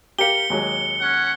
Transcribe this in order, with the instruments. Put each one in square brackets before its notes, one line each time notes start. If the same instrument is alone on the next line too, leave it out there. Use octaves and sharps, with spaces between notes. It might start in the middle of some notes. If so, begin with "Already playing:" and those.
[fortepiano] G4 A#4 F5 [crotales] C#7 G7
[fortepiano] D#2 F#3 G#3
[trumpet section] C#4 F#5